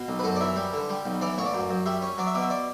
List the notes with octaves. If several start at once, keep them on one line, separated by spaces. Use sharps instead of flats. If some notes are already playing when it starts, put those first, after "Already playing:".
Already playing: B2
B1
B4
F#2 A4
D5
E3 E5
G3
D3
G3
B1
E3 D5
A1 C#5
D5
F#2
F#2
G3 E5
C#4
F#3 D5
E5
B2 D5
E5
D5